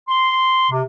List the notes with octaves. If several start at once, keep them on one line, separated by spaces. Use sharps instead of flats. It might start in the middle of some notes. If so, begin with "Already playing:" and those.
C6
C3